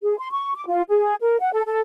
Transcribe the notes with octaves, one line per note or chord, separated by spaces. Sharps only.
G#4
C6
C#6
D6
F4
G#4
A#4
F#5
A4
A4